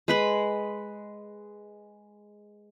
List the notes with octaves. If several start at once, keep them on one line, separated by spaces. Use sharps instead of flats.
G#3 B4 B5